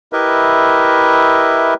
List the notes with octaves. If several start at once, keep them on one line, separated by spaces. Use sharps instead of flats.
E4 G4 A#4 B4 D#5 E5